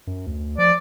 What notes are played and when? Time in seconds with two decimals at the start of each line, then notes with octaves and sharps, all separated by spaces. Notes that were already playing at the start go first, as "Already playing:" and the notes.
0.07 F#2
0.26 D2
0.58 F3 D5